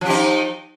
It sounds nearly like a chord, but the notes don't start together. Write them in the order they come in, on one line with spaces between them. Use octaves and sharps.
F3 G4 D#4